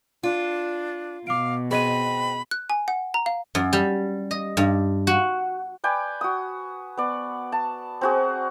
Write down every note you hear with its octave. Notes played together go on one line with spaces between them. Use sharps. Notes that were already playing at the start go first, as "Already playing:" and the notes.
D4 F4
B2 F5 D6 D7
C4 G#4 D#5 B5 D#7
F#6
G#5
F#5
A#5
F5
F#2
G3
D#5
G2
F#4
B4 D5 G5 G#5
F#4 D#6
B3 D5
A5
C4 F#4 G#4